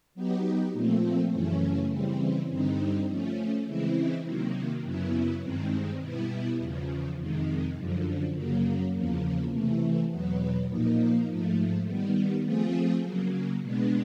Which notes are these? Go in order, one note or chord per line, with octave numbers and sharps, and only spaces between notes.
F#3 B3 D#4 G4
A#2 F3 A3 C4
F#2 C#3 E3 A3 C#4
C#3 E3 G3 C4
G2 D3 G3 C4 D#4
F3 A3 C#4
C#3 E3 G#3 C4 E4
C3 D#3 F#3 A#3
F#2 C#3 F#3 B3 E4
G2 D#3 G#3 C4
B2 G3 B3 E4
E2 C#3 F3
F2 C3 D#3 G#3
F#2 D3 F3
F#2 C#3 F#3 A#3
E2 C#3 F3 A#3
C3 E3 A3
E2 B2 F#3 B3
A#2 F3 A#3 D#4
G#2 F3 A3
D#3 G3 B3
F3 A3 C4 F4 G#4
C#3 F#3 A#3
B2 G#3 B3 D4